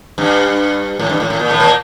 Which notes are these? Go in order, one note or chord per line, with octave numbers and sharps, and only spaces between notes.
G2
A2
G2
A2
A2
A#2
A2 A3
A#2 A#3